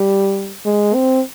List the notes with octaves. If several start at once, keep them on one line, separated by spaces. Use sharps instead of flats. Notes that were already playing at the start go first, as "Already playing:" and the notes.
Already playing: G3
G#3
C4